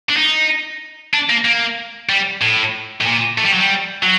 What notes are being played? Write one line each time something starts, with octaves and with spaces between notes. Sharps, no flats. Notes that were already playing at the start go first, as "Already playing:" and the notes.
D4
D#4
D4
A#3
A#3
G3
A2
A2
A#2
A3
G3
F#3
G3
F#3